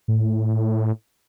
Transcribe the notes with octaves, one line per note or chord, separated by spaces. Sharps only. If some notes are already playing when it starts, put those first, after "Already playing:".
A2